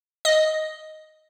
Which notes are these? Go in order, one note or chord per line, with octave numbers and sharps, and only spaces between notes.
D#5